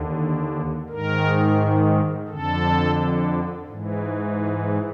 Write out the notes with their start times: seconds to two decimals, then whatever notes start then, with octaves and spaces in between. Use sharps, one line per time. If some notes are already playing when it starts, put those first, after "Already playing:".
Already playing: D#2 D3
0.89 G#2 D#3 A#4
2.28 F2 D3 A4
3.67 G#2 E3
4.38 G#4